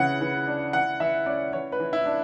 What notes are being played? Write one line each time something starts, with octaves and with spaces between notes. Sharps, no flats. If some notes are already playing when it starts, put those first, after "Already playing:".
Already playing: C#3 E3 C#4 F#5
E3
D4
E3 F#5
E3 E5
C#4 D5
E3 C#5
B4
E3
E4
D4